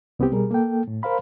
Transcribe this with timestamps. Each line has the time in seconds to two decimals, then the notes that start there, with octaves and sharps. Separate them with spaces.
0.19 C2 B3 C4 G4
0.32 B2 G3 G#4 A#4
0.51 A#3 A4 G5
0.88 A2
1.03 A#4 C5 F5 B5